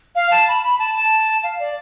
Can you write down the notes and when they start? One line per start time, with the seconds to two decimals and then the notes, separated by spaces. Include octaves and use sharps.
0.15 F5
0.31 A5
0.48 B5
0.63 B5
0.79 A5
0.95 A5
1.43 F5
1.60 D5